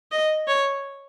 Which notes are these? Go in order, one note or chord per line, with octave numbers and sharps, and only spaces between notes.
D#5
C#5